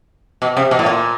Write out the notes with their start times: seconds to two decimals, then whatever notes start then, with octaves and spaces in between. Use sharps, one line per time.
0.42 B2
0.57 C3
0.71 B2
0.79 A2
0.86 A#2